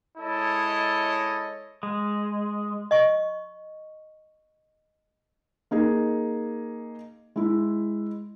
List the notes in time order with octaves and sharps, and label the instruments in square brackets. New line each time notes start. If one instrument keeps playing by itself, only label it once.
[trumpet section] G#3 E4 A4 C#5 D#5
[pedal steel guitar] G#3
[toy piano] D#5 C#6
[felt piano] A#3 D#4 G#4
G#3 E4